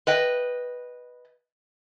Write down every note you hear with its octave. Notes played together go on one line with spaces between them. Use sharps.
B4 D#5 G5